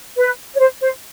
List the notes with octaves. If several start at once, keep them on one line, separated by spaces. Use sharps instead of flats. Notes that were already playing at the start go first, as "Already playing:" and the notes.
B4
C#5
C5
C5